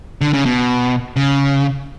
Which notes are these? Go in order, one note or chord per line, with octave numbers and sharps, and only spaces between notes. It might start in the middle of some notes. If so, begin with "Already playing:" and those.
D3
C#3
B2
C#3